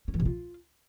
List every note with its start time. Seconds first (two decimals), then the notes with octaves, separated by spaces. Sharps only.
0.08 C#4
0.14 E3
0.20 C3
0.25 F4